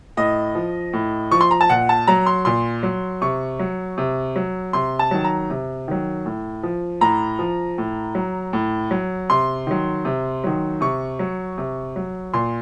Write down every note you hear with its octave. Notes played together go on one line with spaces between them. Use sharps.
A2 D#5
F3
A2
F3 C#6
C6
A#5
A5
A#2 F#5
A5
F#3 A#5
C6
A#2 C6
F#3
C3 C#6
F#3
C3
F#3
C3 C6
A5
D#3 F#3
A#5
C3
D#3 F#3
A2
F3
A2 A#5
F3
A2
F#3
A2
F#3
C3 C6
D#3 F#3
C3
D#3 F#3
C3 C#6
F#3
C3
F#3
A#2 C6